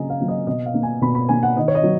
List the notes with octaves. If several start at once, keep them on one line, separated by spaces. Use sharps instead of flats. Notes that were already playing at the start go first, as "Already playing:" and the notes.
Already playing: C#3 F#3 A#3 D#5 G#5 A#5
F5
F#3 A#3
D#5
B2 D#5
F5
A#3
G#5
B2 B5
B5
A#3 G#5
F#5
D#3 D#5
C#5
D#5
F#3